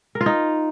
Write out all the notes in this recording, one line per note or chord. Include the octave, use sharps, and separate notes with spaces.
A#4
F4
D#4